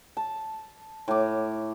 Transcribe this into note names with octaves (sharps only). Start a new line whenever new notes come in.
A5
A2 D6